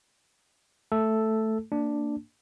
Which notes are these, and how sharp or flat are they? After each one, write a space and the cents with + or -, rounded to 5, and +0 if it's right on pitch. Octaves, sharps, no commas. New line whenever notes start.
A3 +0 A4 +0
A#3 -25 D4 +0